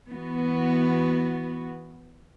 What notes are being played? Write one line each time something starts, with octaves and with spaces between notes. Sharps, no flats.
E3 B3 F#4